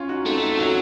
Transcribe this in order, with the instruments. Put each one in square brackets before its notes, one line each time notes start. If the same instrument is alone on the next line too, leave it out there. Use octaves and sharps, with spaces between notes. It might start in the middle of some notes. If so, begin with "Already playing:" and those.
Already playing: [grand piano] C#4 F4
D#4 F#4
[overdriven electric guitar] A3 [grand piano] C4 D#4
[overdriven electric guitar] F#3 [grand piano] C#4 F4